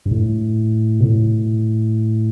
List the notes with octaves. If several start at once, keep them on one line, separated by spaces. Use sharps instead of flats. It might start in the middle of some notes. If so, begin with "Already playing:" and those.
G2
A2
B2
A2